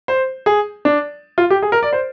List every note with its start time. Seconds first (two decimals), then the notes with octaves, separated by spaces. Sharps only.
0.08 C5
0.46 G#4
0.85 D4
1.38 F4
1.50 G4
1.62 G#4
1.72 A#4
1.83 D5
1.93 C5